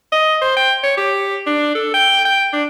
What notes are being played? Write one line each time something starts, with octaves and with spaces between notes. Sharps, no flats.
D#5
C5
G5
C#5
G4
D4
A4
G5
G5
D4